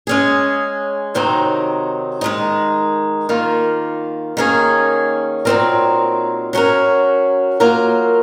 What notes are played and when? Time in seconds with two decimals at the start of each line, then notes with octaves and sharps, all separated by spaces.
0.07 G#3 C#4 G#4
1.15 C3 D#3 F#3 C4 D#4
2.21 D#3 G#3 D#4
3.29 D#3 A#3 F4
4.37 D#3 A#3 C#4 G#4
5.45 A#2 F#3 C4 D#4 A#4
6.53 F#3 C#4 F#4 A#4
7.60 F#3 A#3 F4 A#4